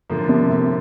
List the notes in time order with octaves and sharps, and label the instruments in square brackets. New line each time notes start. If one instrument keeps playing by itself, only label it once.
[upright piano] A2 [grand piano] D3 F3 A#3
[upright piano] C3
A2